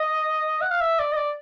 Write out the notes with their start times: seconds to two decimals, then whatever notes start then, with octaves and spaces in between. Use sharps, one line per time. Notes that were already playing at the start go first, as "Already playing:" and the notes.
Already playing: D#5
0.61 F#5
0.71 F5
0.81 E5
0.99 D5
1.12 D#5
1.17 D5